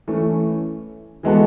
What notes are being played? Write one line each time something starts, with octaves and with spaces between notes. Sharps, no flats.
E3 A3 C#4
E3 G#3 B3 F#4 A4